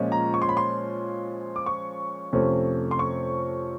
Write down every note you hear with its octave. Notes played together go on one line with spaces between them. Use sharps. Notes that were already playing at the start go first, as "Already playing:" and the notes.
Already playing: A#2 F3 G#3 C#4
A#5
C#6
C6
B5
C6
D6
C#6
F2 C3 F3 A3 C#4
C6
C#6